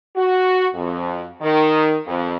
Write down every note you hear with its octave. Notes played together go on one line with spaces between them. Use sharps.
F#4
F2
D#3
F2